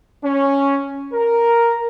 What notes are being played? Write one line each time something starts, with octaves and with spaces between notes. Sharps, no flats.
C#4
A#4